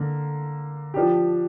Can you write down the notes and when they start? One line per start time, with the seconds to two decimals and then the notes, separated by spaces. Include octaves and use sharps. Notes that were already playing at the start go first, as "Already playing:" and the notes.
Already playing: D3 A#3
0.94 F3 D4 G4